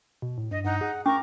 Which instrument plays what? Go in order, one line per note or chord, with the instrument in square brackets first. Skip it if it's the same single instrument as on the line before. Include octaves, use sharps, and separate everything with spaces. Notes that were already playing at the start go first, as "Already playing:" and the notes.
[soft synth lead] B2
A2
[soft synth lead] G2 [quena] D#5
[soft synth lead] G2 [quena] D#4 [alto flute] F#5
[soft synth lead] G#4 [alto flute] F#5
[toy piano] C#4 [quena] A#4 [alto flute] C#6 [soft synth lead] D6